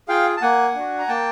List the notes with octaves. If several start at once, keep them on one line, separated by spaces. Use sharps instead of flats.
F4 G#4 F5 G5
A5
A#3 F#5 G#5
D4 F#4
A#5
A#3 G5 A5